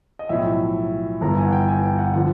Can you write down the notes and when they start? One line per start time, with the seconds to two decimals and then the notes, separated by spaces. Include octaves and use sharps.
0.19 D#5
0.29 B1 A2 F3 E5
1.21 G1 G2 E3 A#5
1.37 G#5
1.46 F#5
1.52 G5
1.68 G#5
1.83 G5
1.99 F#5
2.14 D3 F3 F#5